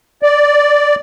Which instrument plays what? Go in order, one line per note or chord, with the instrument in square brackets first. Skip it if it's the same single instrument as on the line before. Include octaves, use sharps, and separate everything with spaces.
[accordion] D5